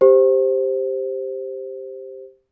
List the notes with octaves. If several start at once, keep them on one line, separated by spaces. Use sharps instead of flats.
G4 C5